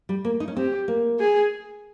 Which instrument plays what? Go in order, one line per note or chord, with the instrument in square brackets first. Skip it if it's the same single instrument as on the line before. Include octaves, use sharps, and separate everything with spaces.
[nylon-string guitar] G3
A#3
D#4
C#4
[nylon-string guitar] C4 [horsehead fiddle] G4
[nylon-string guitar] A#3
[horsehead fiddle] G#4